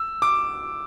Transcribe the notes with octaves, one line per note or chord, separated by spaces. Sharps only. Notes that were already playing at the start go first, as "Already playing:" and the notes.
Already playing: E6
D6